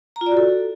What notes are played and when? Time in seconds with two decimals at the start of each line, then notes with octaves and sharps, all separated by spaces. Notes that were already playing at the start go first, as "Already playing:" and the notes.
0.16 A#5
0.21 F4
0.26 D5
0.32 F#4
0.37 A4